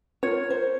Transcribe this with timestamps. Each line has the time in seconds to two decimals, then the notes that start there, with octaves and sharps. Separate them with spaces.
0.23 F4 A#4 C#5
0.50 C5